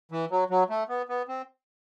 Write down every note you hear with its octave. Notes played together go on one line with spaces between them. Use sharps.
E3
F#3
F#3
A3
B3
B3
C4